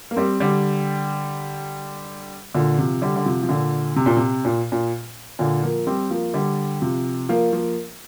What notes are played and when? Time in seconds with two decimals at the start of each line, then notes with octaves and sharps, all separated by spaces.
0.11 A#3
0.16 G3 C4
0.40 D3 G3
2.55 A#2 D3
2.78 C3 F3
3.02 D3 G3
3.16 D3
3.26 C3 F3
3.43 F3
3.49 A#2 D3
3.96 C3
4.06 A#2
4.17 C3
4.45 A#2
4.72 A#2
5.39 A#2 D3
5.63 F3 A#3
5.87 G3 C4
6.11 F3 A#3
6.34 D3 G3
6.82 C3 F3
7.29 F3 A#3
7.53 F3 A#3